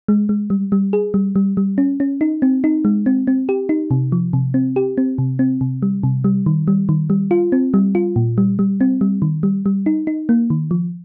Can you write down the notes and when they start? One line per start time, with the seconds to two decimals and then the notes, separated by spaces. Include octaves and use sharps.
0.08 G#3
0.29 G#3
0.50 G3
0.72 G3
0.93 G#4
1.14 G3
1.36 G3
1.57 G3
1.78 C#4
2.00 C#4
2.21 D#4
2.42 C4
2.64 D#4
2.85 G#3
3.06 C4
3.27 C4
3.49 G4
3.69 D#4
3.91 C3
4.12 F3
4.33 C3
4.54 C4
4.76 G4
4.98 C4
5.18 C3
5.39 C4
5.61 C3
5.82 G3
6.03 C3
6.24 G3
6.46 D#3
6.68 G3
6.89 D#3
7.10 G3
7.31 F4
7.52 C4
7.74 G3
7.95 F4
8.16 A#2
8.38 G3
8.59 G3
8.81 C4
9.01 G3
9.22 D#3
9.43 G3
9.66 G3
9.86 D#4
10.07 D#4
10.29 A#3
10.50 D#3
10.71 F3